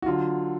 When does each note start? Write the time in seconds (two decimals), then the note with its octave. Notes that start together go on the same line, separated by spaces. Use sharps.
0.02 F#4
0.06 D3 F#3 F4